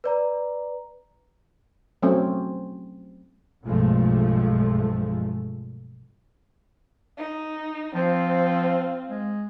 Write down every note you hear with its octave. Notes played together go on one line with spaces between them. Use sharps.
B4 D5 A#5
F#3 A3 C4 C#4
B1 G2 F3 G#3 A3
D#4
F3 C4 F4
G#3